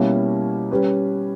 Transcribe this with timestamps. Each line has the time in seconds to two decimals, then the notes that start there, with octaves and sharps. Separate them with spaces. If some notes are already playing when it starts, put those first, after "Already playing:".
Already playing: B2 G3 A#3 C#4 E4
0.71 G3 C#4 G4 B4